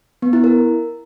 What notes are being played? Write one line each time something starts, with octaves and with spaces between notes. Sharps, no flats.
B3
E4
A#4